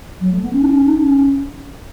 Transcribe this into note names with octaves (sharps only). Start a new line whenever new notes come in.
F#3
A3
B3
C#4
D#4
C#4
D#4
C#4
C#4